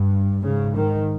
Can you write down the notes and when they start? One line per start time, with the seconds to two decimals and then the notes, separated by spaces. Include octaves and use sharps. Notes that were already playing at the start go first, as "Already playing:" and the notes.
Already playing: G2
0.43 G#2 C#3
0.76 D#3